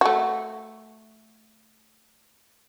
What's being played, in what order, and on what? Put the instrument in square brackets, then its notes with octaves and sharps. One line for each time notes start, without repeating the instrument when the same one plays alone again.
[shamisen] A3 F#4